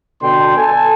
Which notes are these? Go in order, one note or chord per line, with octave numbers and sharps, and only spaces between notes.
B2 D3 G5 C6
A4 G#5